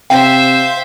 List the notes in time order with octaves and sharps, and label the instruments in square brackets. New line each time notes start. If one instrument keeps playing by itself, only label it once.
[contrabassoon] C3 [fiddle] C5 E5 [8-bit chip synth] F5 [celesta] G5